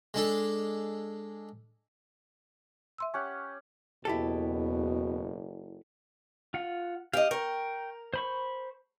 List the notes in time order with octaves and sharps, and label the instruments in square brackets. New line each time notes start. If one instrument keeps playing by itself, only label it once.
[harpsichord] G#3 D4 A4
[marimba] E5 C6 E6
[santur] C#4 G4 F#5
[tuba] F#1 [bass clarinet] E2 [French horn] B2 [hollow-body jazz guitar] E4 G4 A4
[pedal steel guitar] F4 F#5
[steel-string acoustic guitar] G4 D#5 [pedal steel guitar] F5
[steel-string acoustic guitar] A#4 [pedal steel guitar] G5 C#6
[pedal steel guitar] C5 B5 C#6